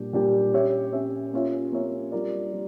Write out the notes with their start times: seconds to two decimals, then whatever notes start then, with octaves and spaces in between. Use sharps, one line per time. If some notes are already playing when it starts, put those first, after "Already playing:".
Already playing: A#2 G3 D4 G4
0.13 A#2 G3 D4 G4
0.53 C#4 G4 C#5 E5
0.93 C#4 G4 C#5 E5
1.33 A#3 C#4 F4 C#5 E5
1.72 A#3 C#4 F4 C#5 E5
2.12 G3 D4 F4 A#4 D5
2.53 G3